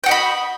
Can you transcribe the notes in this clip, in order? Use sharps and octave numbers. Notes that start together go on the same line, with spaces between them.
F#4 D#5 G5 B5